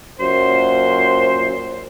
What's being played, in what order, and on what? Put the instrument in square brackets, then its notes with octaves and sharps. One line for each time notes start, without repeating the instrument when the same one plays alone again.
[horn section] F#2 A#2 C5